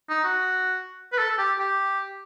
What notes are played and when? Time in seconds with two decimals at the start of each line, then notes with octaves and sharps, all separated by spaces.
0.09 D#4
0.24 F#4
1.12 B4
1.18 A4
1.31 A4
1.38 G4
1.59 G4